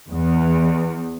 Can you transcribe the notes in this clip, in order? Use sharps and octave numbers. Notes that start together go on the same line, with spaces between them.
E2